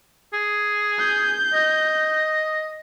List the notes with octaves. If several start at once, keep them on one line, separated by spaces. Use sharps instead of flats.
G#4
G6
D#5